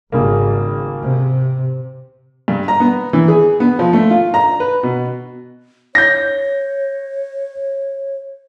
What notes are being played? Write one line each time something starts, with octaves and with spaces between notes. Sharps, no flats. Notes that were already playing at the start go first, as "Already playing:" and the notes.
G#1 C#3 G3 A#3
C3
G2
A#5
B3
E3
G#4
B3
F3
A3
F4
A#5
B4
B2
C#5 G6 A#6